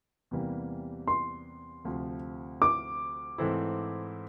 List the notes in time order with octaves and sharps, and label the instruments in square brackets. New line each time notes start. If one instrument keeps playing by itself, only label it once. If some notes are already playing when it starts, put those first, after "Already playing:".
[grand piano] E2 C3 E3 G3 A#3
[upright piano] C6
[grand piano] D2 C3 F3
[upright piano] D6
[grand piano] G#2 E3 A3 C4 E4